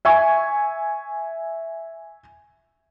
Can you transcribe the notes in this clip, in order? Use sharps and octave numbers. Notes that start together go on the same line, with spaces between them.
E5 G#5 C#6